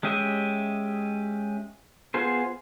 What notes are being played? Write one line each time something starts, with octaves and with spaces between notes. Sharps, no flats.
G#3 C#4 G4 D#5 E5
B3 F4 G#4 C5